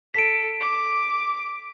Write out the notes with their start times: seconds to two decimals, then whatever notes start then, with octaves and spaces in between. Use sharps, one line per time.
0.14 A4 B6 D7
0.61 D6